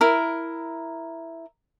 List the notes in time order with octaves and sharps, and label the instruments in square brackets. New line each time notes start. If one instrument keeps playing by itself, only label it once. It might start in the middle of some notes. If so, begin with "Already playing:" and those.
[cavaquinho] E4 A#4